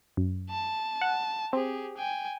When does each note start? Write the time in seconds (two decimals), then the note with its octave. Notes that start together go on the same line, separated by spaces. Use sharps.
0.17 F#2
0.50 A5
1.01 F#5
1.53 C4 G4 G#4
1.97 G5 G#5